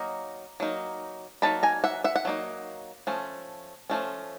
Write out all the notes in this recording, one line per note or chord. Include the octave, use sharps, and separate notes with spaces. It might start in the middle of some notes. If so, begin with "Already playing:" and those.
Already playing: F#3 A#3 D#4
F#3 A#3 D#4
F#3 A#3 D#4 A5 B5
G#5 A#5
E5 F#5
E5 F#5
F#5
F#3 A#3 D#4
F3 A3 C#4
F3 A3 C#4